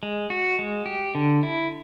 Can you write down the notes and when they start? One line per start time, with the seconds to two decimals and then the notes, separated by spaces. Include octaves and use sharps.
0.03 G#3
0.30 F#4
0.59 G#3
0.86 G4
1.15 D3
1.43 E4